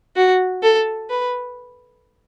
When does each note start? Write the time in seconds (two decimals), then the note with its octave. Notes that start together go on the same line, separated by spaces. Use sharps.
0.16 F#4
0.63 A4
1.10 B4